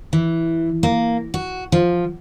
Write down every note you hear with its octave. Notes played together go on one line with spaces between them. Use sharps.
E3
A#3
F#4
F3